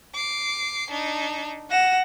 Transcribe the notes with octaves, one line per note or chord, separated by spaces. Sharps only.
D6 C7
D4 D#4
F#5 A#6 E7